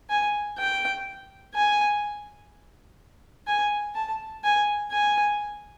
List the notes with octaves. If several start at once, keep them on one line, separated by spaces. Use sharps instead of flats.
G#5
G5
G#5
G#5
A5
G#5
G#5